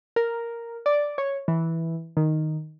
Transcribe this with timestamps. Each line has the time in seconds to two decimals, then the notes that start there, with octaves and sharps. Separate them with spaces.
0.16 A#4
0.86 D5
1.18 C#5
1.48 E3
2.17 D#3